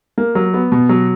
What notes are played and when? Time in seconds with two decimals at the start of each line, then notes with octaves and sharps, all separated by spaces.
0.18 A#3
0.35 F#3
0.54 B3
0.72 B2
0.89 F#3